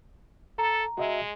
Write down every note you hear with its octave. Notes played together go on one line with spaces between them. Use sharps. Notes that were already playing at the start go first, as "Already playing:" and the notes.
A4 A#5
G#3 F#4 D#5 E5